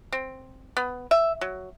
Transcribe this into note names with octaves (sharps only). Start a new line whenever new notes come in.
C4
B3
E5
F#3